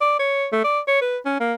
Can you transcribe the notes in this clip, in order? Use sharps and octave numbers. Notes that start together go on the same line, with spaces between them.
D5
C#5
A3
D5
C#5
B4
C#4
A#3